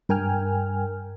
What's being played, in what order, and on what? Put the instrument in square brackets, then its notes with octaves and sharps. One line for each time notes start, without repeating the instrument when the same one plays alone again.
[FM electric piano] G2 A#4 G5 G#5 F6